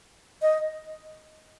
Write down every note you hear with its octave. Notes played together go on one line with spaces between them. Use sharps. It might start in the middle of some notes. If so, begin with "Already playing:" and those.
D#5